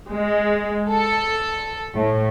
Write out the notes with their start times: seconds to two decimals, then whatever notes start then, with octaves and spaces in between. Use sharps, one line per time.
0.12 G#3
0.92 A4
1.94 A2